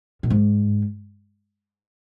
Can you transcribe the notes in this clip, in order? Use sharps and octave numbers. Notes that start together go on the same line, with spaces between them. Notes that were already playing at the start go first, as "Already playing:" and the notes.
A#2
G#2